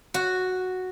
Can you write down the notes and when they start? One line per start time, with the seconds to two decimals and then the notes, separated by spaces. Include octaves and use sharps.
0.14 F#4